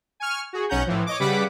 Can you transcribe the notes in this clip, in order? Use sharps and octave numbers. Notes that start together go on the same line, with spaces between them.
G#5 C#6 F6
F#4 G#4
B1 C#4 F#5 A#5 G6
A2 E3 F3
C#5 D#5 D6
C#3 G3 B4 F#5 D6 B6